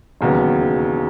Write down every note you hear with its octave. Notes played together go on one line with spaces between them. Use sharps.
E1 D#2 C#3 F#3 B3